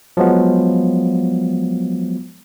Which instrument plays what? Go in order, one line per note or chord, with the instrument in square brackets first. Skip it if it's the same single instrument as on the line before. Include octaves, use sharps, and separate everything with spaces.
[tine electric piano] F3 F#3 G#3 B3